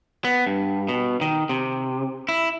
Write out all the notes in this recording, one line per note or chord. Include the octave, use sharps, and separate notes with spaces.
B3
G2
B2
D#3
C3
E4